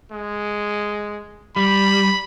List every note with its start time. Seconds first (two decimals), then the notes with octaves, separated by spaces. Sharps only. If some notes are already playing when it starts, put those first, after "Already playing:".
0.12 G#3
1.56 G3 B5